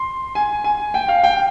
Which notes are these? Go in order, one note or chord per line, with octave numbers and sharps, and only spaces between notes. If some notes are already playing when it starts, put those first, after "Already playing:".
Already playing: C6
G#5
G#5
G5
F5
G5